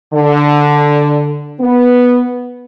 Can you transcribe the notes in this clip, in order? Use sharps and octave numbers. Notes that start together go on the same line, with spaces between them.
D3
B3